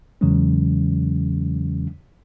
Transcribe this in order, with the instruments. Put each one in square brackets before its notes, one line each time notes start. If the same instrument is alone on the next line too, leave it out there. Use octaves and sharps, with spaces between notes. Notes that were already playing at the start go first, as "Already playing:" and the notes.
[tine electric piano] E2 C#3 E3 F#3 G#3 C#4